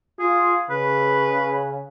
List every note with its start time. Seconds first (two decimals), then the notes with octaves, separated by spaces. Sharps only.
0.20 F4 G#4
0.70 C#3 B4